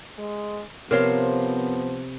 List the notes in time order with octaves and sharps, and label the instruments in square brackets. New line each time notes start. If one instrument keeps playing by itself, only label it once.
[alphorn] G#3
[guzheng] C3 C6 [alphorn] F3 [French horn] B3 [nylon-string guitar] A#4 C#5 F5